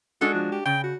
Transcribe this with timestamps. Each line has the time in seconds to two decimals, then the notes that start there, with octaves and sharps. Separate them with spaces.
0.21 G#3 D4 F#4 A4
0.34 F3
0.52 G4
0.66 C#3 G5
0.83 F#4